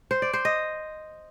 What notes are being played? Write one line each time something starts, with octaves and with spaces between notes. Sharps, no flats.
C5
D5
C5
D#5